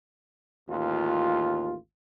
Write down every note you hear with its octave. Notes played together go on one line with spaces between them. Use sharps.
A1 D#2 F4